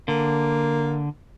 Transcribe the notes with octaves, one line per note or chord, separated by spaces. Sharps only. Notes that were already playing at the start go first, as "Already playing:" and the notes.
D3 A#3